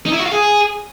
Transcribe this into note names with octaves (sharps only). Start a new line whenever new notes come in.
D#4
E4
F#4
F4
G#4